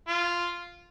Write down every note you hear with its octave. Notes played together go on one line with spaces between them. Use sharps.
F4